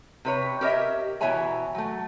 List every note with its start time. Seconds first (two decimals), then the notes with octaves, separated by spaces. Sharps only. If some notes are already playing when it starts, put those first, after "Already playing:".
0.25 C3 B4 C#5
0.61 G4 A#4 C#5 D#5 E5
1.21 B2 E3 C#5 E5 G#5 A#5
1.75 F#3 A3